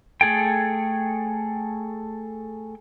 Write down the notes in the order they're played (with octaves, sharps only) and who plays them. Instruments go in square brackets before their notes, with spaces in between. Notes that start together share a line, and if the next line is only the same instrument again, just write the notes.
[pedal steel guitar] A3 G#4 A4 G5